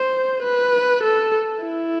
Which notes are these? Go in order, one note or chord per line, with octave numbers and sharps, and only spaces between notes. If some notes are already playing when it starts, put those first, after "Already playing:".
Already playing: C5
B4
A4
E4